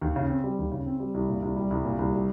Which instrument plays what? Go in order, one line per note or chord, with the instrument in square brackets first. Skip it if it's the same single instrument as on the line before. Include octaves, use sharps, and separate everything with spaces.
[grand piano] D#2
C#3
C4
G3
D#2
C#3
C4
G3
C2
A#2
C2
G3
C2
A#2
C2
G3